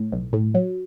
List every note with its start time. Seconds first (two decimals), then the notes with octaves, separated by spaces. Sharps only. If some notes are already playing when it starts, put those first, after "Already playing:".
Already playing: A2
0.12 B1
0.33 A2
0.54 F#3